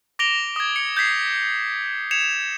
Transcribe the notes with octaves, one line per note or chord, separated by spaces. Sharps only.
D6 A#6 D7 F7 G7
D#6 G#6
C#7
G6 G#6 B6 C7
G#6 C#7 E7 F7